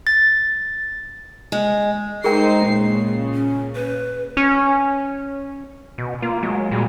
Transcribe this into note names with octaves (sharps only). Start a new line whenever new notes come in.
A6
G#3
G#3 D#4 G#4 A#4 C5 G5 C7
A#2 C#3
C#4
B4
C#4
B2
A#3 F4
F#3 G#3
A#2 G3 F#4 G#4